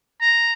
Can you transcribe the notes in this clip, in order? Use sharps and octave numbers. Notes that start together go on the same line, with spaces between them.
A#5